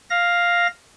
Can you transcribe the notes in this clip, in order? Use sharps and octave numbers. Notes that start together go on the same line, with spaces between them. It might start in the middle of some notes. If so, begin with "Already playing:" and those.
F5 A#6